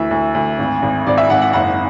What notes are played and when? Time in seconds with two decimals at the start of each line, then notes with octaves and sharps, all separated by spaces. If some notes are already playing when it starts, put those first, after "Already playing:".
Already playing: D2 E3 E5
0.11 D2
0.35 D2
0.58 G#1
0.82 G#1
1.07 G#1 D5
1.18 E5
1.30 G#1 F#5
1.42 F#5
1.53 F#1 F#5